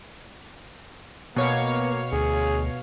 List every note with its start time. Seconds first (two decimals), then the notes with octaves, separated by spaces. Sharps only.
1.36 B2 A#3 B3 C#5 F5
2.13 D2 G#4